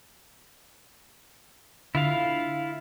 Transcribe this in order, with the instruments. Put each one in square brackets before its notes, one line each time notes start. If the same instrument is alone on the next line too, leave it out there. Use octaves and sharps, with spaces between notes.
[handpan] D3 [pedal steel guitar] E4 F4 F5